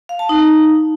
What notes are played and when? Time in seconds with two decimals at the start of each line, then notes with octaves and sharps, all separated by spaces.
0.09 F5
0.19 A5
0.29 D#4